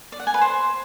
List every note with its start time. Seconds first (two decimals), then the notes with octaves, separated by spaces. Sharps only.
0.12 D5
0.20 F#5
0.27 G#5
0.34 B4
0.41 C5